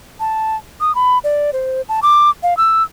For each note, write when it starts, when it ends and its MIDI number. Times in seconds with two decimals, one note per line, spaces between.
0.20 0.57 81
0.81 0.95 87
0.95 1.19 83
1.24 1.51 74
1.53 1.82 72
1.89 2.00 81
2.03 2.30 86
2.43 2.57 77
2.57 2.83 88